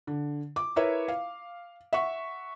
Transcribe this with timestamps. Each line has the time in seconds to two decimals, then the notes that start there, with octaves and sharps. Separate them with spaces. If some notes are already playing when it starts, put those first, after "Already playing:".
0.07 D3
0.56 D6
0.76 E4 A#4 B4 C#5 E5
1.08 F5
1.93 E5 F#5 C#6